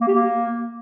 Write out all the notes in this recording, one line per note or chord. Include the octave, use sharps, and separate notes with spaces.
A#3
G4
A#3